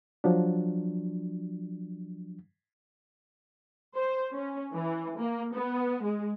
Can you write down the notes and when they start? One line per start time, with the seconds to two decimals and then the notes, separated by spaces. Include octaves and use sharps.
0.24 F3 F#3 D4
3.96 C5
4.33 C#4
4.73 E3
5.20 A#3
5.54 B3
6.03 G#3